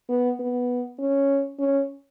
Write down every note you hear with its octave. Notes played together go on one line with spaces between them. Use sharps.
B3
B3
C#4
C#4